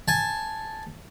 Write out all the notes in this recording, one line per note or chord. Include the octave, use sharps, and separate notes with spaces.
G#5 A5